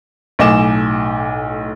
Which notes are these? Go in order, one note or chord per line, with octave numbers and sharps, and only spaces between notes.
B1 A2 D#5 G#5 D6 E7